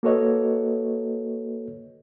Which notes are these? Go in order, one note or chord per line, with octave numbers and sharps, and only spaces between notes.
A#3 F#4 A4 B4 C#5 D#5